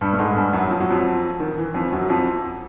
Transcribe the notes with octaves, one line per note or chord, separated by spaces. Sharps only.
G2 G3
A3
G#2 G#3
G2 G3
F#2 F#3
F3
F#3
F2 F3
D#3
E3
F2 F3
F#2 F#3
F2 F3